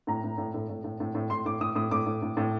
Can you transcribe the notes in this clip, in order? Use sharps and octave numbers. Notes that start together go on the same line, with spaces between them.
A2 A#5
A2
A2
A2
A2
A2
A2
A2
A2 C6
A2 D6
A2 D#6
A2 D#6
A2 D6
A2
A2
A2